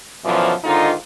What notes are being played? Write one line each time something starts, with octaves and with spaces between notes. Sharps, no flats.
F#2 B2 D3 E3 F3
G#2 D3 D#3 D#4 F4